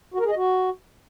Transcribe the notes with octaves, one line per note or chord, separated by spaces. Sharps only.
F#4
A#4
G#4
D#5
F#4